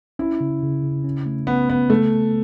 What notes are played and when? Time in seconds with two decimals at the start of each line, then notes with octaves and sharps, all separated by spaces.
0.19 C#4 E4
0.41 C#3
0.63 C#3
0.83 C#3
1.04 C#4
1.26 A3
1.47 B3 C#4
1.70 B3 C#4
1.90 C#3 A3
2.12 C#3